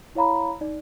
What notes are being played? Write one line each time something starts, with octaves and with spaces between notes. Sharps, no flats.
E4 C#5 F5 A#5 B5
D#4 D5